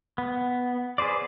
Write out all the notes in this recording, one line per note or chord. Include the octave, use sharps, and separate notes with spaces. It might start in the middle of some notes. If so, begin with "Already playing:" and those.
B3
G#4 B4 C5 D5